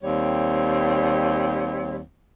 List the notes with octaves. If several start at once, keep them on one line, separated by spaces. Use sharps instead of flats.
D#2 G3 C4 C#5